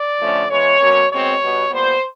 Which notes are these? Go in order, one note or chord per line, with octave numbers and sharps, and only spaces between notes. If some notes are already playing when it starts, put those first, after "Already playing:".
Already playing: D5
D3 F3 A3 C#4
E3 G#3 B3 C#5
B2 F#3 A#3 C#4
B2 G#3 C4 C#5
B2 G3 B3
A#2 G3 B3 C5